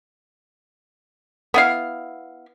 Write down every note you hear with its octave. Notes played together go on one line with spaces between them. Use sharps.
B3 E4 F5